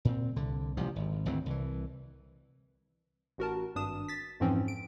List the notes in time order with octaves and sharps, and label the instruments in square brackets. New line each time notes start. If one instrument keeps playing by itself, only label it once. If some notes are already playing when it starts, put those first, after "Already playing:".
[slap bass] A#2 C4
C2 D3
A1 C3 F3 G3
G#1
G#1 D2 E3 C4
C2 E3
[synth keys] A1 F#4 A#4 A5
G#1 G2 D4 D#6 E7
A6 B6
F2 G#2 E3 F3 C4 C#4
D7